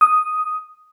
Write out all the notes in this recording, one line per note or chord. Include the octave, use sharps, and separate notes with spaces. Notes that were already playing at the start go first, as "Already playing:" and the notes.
D#6